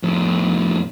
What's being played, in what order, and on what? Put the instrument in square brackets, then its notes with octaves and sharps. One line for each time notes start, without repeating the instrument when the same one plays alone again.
[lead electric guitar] F2 A2